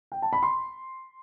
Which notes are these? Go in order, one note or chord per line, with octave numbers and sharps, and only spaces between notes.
G5
A5
B5
C6